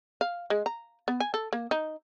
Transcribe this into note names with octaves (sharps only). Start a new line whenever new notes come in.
F5
G#3
A#5
B3
G#5
A4
A#3
D#4